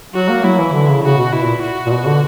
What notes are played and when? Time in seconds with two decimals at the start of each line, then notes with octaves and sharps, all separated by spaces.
0.15 F#3 F#4
0.29 A#3
0.44 F#3 E4
0.59 E3
0.73 D3
0.88 C#3
1.03 C#3 F#4
1.18 B2
1.32 B2 E4
1.43 A#2
1.63 F#4
1.86 A#2
1.92 B2
2.06 D3